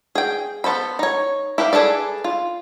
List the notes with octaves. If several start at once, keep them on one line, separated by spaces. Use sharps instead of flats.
G#4 G5
B3 A4 C5 B5
D#4 C#5
E4 G4 B4 F5
G#4 A4 B4 D5
F4